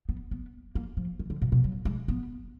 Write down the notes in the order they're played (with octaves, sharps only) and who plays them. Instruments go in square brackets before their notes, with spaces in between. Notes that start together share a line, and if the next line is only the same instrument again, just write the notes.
[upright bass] B3
B3
A#3
F3
D#3
D3
A#2
B2
F#3
G#3
B3